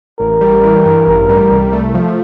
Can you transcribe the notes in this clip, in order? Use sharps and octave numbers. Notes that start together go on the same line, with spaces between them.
A1 A#4
G3
E3
G2
A1
G3
C2
A3
F3